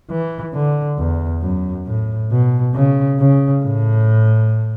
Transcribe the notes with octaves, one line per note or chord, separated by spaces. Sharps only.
E3
D3
E2
F#2
A2
B2
C#3
C#3
A2